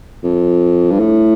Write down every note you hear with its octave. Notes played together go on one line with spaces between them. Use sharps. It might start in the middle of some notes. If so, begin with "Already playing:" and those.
F2
G2
A2